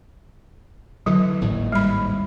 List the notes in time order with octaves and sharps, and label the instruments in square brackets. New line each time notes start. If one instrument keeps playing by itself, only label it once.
[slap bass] D3 E3 [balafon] F#3
[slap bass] G#1 D#2 A2
[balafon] G3 B5